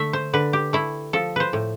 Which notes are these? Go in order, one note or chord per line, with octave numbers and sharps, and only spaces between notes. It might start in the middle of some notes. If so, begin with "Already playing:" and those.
Already playing: D3 A3 E5
C5
D3 B4
G4
A3 E4
F3 A4
B4 C5
A2